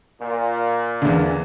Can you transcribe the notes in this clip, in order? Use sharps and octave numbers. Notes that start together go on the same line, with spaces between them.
A#2
E2 D3